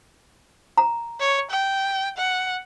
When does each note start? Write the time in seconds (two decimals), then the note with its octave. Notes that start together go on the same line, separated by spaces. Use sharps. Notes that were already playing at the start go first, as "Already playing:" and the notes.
0.78 A#5
1.20 C#5
1.51 G5
2.17 F#5